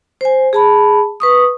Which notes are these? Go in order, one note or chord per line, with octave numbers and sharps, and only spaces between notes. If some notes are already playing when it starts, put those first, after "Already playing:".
C5 G#5
G#4 A5 B5
B4 C#6 D#6